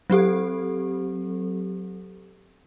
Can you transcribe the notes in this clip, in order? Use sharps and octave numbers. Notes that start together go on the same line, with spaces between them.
F#3 C4 G4 A4